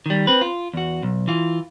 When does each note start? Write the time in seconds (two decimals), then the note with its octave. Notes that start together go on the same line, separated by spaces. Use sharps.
0.06 D#3 G3
0.27 C4 B4
0.41 F4
0.74 E2 F#4
1.03 B1
1.28 E3 F4